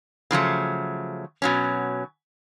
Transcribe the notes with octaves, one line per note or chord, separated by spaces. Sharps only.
C#3 F3 F#3 A3
B2 F#3 C#4